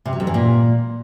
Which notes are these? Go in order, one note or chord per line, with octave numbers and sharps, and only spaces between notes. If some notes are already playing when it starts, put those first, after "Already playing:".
C3
F#3
F2
E3
A#2